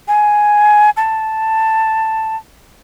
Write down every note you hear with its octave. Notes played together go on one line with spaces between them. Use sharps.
G#5
A5